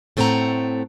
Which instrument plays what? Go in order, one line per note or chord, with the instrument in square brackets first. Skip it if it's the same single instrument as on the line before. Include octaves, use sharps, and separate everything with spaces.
[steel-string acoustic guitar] A2 A3 C4 D#4 F#5 A#5